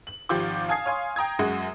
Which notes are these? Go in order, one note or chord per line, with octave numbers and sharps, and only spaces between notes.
F#7
G#1 F3 F4 G4 D6
F5 G#5 A5 D#6 G#6 C7
C#5 F5 G#5 C6
G5 A#5 D#6 G#6
F#2 G#3 F#4